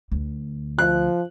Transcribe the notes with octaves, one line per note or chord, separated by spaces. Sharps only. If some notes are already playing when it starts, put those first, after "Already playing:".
D2
F3 F#6